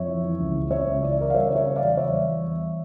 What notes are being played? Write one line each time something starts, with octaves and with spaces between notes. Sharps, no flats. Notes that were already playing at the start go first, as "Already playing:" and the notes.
Already playing: F2 C#5 E5
E3
E3
C#2
C#3
C#3 C#5 E5
C#2
E3 D5
E5
E3 A#4 D5
F5
G3 C#5 E5
C#3
C#5 E5
C#3
D5 F5
E2
E2 C#5 E5
G3
E2
E2